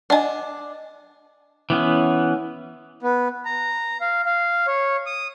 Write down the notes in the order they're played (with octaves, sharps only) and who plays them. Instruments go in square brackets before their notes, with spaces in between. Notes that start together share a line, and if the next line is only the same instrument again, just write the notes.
[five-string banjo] D4 G#5 [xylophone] D#5 F#5
[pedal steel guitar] E3 B3 C#4
[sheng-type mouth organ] B3
A#5
F5
F5
C#5
D#6